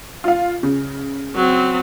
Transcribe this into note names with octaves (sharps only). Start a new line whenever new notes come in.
F4 F5
C#3
F#3 C4